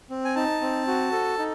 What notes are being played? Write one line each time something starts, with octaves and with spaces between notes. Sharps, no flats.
C4
G#5
D#4 A5
C4
F#4
A4
D#4